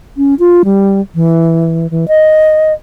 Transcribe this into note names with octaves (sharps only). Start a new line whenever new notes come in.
C#4
F4
G3
E3
E3
D#5